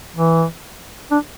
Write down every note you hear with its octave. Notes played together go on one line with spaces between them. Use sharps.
E3
D4